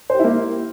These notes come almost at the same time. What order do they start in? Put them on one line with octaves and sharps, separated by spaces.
C5 G4 E4 A#3